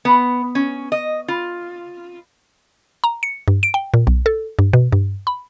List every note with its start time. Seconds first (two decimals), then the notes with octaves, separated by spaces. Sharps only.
0.05 B3
0.55 C#4
0.92 D#5
1.28 F4
3.04 A#5
3.23 C#7
3.48 G2
3.63 D7
3.74 G5
3.94 A#2
4.07 B1
4.26 A4
4.59 G2
4.73 B2
4.92 G2
5.27 B5